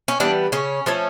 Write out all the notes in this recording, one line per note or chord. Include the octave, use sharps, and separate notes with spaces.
C#4
E3 G3 B3 D4
C#3 C#4
F3 A3 C#4